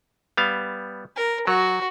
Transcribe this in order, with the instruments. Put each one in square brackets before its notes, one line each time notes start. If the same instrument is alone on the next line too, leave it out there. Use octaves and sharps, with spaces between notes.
[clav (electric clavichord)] G3 B3 F5
[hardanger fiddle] A#4
[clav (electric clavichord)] F#3 [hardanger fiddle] F#4